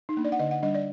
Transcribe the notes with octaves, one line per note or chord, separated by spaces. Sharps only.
D#4
A#3 D4
D5
F#5
D3 D#5
F#5
G3 D4 D#5
D5